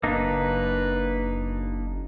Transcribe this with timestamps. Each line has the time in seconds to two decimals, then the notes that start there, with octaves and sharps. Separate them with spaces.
0.03 F#1 A#3 D4 D#4 B4